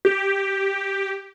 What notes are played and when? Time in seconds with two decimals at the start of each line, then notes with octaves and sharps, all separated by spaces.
0.05 G4